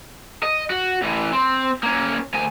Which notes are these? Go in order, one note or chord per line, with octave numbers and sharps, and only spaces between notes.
D#5
F#4
A2 E3
C4
A#3 C#4
D2 G#5